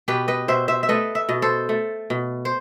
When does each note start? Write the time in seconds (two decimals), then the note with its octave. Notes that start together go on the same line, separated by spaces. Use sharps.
0.08 B2 G4 B4
0.28 B4 D#5
0.48 B2 C5 E5
0.68 C5 E5
0.83 E5
0.89 A3 B4 D#5
1.15 E5
1.29 B2 D#5
1.42 A4 C5
1.69 A3
2.10 B2
2.45 C5